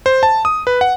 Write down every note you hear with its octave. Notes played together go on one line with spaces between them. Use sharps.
C5
A5
D#6
B4
F#5